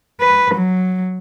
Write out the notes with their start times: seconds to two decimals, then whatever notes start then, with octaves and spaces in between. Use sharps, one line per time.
0.21 B4
0.55 F#3